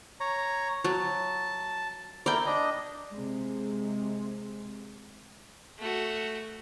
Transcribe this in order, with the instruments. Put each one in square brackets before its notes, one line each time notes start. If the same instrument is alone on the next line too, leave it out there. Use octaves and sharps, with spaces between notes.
[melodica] C#5 A#5
[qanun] F#3 [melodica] A5
[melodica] E4 A#4 [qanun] D5 G5
[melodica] D4 D#5
[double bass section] C3 G#3
[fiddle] A3 F#4